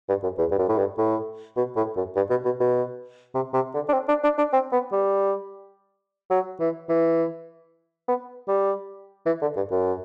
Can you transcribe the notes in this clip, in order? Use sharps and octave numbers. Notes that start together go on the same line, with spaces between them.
G2
F#2
E2
G2
F#2
A2
G2
A2
B2
A2
F#2
G2
B2
B2
B2
C3
C3
D3
D4
C4
D4
D4
D4
C4
B3
G3
F#3
E3
E3
B3
G3
E3
D3
G2
F#2